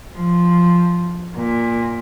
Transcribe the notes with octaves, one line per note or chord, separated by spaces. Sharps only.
F3
A#2